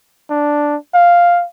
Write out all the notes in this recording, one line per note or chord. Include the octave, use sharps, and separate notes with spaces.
D4
F5